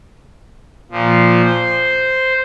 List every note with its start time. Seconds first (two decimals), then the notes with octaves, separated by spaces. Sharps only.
0.91 A#2 F3
1.45 C5